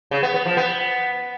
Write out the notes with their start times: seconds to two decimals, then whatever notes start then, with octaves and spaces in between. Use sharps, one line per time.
0.11 C#3
0.23 B3
0.34 B3
0.45 F3
0.57 B3